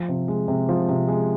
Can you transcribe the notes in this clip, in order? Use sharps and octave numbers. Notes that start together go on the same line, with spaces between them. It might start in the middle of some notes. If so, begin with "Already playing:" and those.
Already playing: F3
C3
G#3
C3
F3
C3
G#3